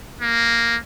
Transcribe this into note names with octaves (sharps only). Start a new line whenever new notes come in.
A#3